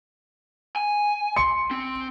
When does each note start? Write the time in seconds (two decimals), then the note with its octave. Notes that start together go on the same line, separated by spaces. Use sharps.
0.76 G#5
1.36 C6 C#7
1.71 C4